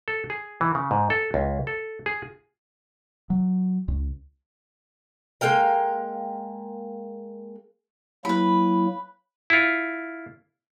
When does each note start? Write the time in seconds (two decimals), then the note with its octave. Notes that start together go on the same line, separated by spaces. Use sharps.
0.08 A4
0.30 G#4
0.61 E3
0.75 C#3
0.91 G#2
1.10 A4
1.34 C#2
1.67 A4
2.06 G#4
3.30 F#3
3.88 C#2
5.41 G#3 A#3 F5 G5
8.25 F#3 A#3 E4 B4 B5
9.50 E4 F4